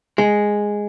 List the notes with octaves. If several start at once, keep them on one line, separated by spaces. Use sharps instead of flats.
G#3